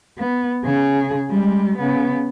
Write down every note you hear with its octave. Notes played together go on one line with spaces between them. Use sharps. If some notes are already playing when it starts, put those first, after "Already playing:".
B3
C#3 G#4
G3 G#3
C#3 B3